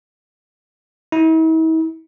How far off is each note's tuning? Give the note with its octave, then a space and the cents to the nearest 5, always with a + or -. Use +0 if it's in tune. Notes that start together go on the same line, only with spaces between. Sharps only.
E4 -45